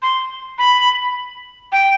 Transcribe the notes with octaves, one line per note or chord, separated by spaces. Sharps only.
C6
B5
G5